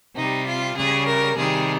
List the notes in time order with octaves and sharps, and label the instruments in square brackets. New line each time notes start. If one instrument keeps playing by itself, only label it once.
[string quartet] C3 G3 D#4
F4
C#3 G3 G#4
A#4
C3 D#3 G3 G#4